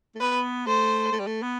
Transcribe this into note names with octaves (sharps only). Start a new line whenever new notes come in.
A3
B3 B4
A3 C5
A3
G3
A3
B3